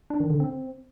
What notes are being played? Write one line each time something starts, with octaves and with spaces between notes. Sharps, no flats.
D4
D#3
D3
C4